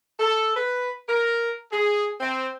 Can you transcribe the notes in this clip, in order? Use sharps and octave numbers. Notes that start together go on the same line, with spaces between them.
A4
B4
A#4
G#4
C4